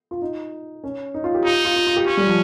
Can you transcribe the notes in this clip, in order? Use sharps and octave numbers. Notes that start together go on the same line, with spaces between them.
F4
D#4
C#4
D#4
F4
G4
D#4 F4
F4
F4
F4
G4
C#4 F4
G3
F3